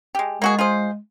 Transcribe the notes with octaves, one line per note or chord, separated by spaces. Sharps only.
G#3 G4
G#3 A#3 F#4 G#4
F4 G#4 C5